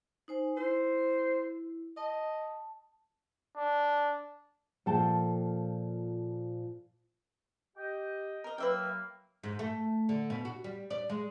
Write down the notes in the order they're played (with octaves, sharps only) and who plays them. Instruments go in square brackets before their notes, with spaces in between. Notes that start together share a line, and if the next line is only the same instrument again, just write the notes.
[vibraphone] D#4 C5 G#5
[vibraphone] E4 [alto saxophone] C5
[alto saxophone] D#5 [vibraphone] A5
[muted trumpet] D4
[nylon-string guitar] A#2 F3 A4 G5 A5
[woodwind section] G4 D#5 G5
[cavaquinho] A#4 D#5
[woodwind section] F#3 A#3 [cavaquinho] B4 E5 G5
[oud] G#2
A3
D3
B2
F#4
G3
D5
G#3